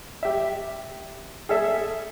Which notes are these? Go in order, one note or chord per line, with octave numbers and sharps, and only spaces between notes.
G4 E5
G#4 A4 E5